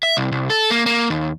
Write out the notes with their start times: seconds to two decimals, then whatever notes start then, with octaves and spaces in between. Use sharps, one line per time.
0.03 E5
0.17 C2
0.32 C2
0.50 A4
0.70 A#3
0.86 A#3
1.10 D#2